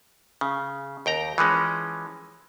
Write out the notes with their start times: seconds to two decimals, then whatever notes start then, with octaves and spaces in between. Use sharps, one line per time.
0.41 C#3
1.06 D#2 G5 A#5
1.38 E3 F3 G#3 C#4